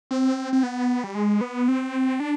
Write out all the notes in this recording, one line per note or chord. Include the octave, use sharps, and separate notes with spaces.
C4
C4
B3
G3
G#3
B3
C4
D4